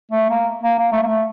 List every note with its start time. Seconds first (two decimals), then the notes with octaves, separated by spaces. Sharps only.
0.11 A3
0.30 A#3
0.63 A#3
0.78 A#3
0.92 A3
1.03 A#3
1.06 A3